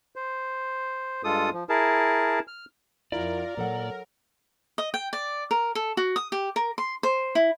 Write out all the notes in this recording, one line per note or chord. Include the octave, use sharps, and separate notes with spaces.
C5
G2 G#3 F4 A4 D#6
F3
E4 G#4 A#4 A5
F6
F2 E4 F4 A#4 D5
A#2 F#3 A4 F#5
D#5
G5
D5
A#4
A4
F#4
D#6
G4
A#4
C6
C5
E4